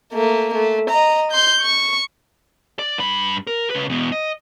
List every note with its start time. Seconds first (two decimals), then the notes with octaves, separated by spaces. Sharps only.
0.13 A3 A#3
0.55 A3
0.90 D#5 A#5
1.32 C6 G6
1.61 C#6
2.79 D5
2.98 G2 B5
3.47 A#4
3.70 C#3 B4
3.89 E2 B2
4.12 D#5